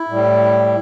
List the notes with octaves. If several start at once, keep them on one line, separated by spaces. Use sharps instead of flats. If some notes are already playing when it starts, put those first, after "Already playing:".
Already playing: E4
A2 G3